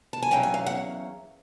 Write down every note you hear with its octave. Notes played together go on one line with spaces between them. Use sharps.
A5
G#5
E2 C#3 F#3 A#3 C#4 G5
G#5
F5
F#5